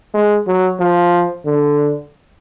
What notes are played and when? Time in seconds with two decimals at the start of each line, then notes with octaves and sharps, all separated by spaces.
0.14 G#3
0.47 F#3
0.80 F3
1.46 D3